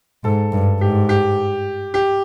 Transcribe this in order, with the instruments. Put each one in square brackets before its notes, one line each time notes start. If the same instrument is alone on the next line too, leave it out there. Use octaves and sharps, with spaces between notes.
[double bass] G#2 [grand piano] A4
[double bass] G2
[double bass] G#2 [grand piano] G4
[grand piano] G4
G4